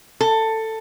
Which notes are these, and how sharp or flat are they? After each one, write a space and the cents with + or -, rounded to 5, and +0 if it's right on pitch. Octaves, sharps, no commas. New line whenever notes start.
A4 +15